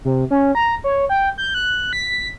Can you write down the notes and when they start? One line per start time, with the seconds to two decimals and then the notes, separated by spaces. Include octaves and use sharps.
0.05 C3
0.31 C#4
0.55 A#5
0.84 C#5
1.09 G5
1.38 G6
1.54 F#6
1.93 B6